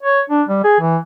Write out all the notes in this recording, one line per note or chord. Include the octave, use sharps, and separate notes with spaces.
C#5
D4
G3
G#4
E3